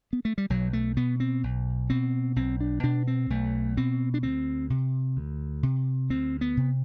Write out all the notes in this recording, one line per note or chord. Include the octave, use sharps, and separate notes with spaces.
B3
A3
G3
B1 F#3
A3
B2 B3
C4
B1
B2 C4
B1 C4
D4
B2 D4
C4
B1 A3
B2 C4
D4
D2 C4
C3
D2
C3
D2 C4
B3
C3